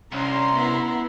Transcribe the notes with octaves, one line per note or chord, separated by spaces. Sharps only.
C2 C#4 A#5 C6
B3 E4